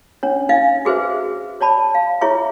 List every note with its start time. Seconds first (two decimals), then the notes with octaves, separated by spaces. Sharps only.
0.23 C#4 D4 C#5
0.49 D#4 D#5 F5
0.85 F#4 G#4 B4 C5 E5
1.61 C#5 D5 A5 B5
1.95 F5
2.21 E4 F4 G#4 C#5 E5 C#6